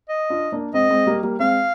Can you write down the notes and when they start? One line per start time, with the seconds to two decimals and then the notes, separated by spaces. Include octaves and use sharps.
0.09 D#5
0.30 D4 F4
0.52 A#3 D4
0.74 G#3 C4 D#5
0.90 G#3 C4
1.07 G3 A#3
1.23 G3 A#3
1.39 G#3 C4 F5